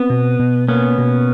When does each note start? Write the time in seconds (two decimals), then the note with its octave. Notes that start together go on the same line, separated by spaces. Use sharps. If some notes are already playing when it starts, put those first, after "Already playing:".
Already playing: B3 C4
0.10 B2
0.40 B2
0.68 A#3 B3 C#4
0.98 B2